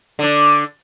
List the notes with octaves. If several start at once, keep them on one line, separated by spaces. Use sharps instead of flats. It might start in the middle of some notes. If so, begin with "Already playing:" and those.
D3 D4